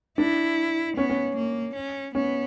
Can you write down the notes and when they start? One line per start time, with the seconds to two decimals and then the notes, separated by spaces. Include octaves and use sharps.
0.18 D4 E4
0.96 B3 C#4
1.10 C#4
1.36 A#3
1.75 C#4
2.15 B3 C#4